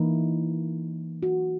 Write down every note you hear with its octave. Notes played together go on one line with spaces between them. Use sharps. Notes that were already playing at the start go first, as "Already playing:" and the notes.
Already playing: E3 A#3 D#4 E4
F#4